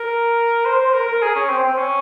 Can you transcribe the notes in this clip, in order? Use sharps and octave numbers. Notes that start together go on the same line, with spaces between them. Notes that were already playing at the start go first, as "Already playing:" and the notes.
Already playing: A#4
C5
C5
A#4
A#4
G#4
C#4
C4
C4
C#4